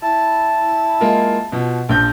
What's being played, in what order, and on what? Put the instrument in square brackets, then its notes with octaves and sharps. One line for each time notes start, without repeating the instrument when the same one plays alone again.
[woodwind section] E4 A5
[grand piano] G#3 A#3 F4
B2 F3
[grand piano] A#1 G6 [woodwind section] F3